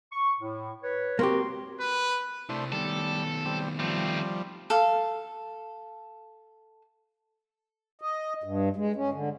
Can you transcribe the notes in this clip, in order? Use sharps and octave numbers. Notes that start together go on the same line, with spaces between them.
C#6
A2
B4 C#5
A#3 C4 F#4 G4 C6
B4
C3 A3 D4 E4 C5
D#3 G3 B3 A4
G3 C4
F3 G3 A3 C4
A4 F5
D#5
G2
G#3
C#4
D3